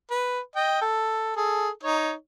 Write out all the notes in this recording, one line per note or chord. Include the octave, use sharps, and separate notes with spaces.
B4
D#5 G5
A4
G#4 A4
D#4 C#5